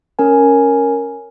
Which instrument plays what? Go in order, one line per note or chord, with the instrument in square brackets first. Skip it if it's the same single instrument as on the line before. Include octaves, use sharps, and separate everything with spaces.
[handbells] C#4 A#4 G#5